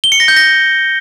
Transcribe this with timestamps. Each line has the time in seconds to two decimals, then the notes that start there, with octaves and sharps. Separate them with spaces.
0.04 G7
0.12 C#7
0.20 A#6
0.28 G6
0.36 A#6